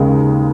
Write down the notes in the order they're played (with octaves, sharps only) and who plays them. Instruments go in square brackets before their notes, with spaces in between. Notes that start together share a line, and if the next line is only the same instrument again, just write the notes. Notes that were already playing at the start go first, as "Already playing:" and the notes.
Already playing: [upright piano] D#2 C#3 G#3